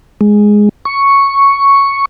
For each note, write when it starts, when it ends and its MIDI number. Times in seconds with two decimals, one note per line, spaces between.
0.21 0.69 56
0.85 2.05 85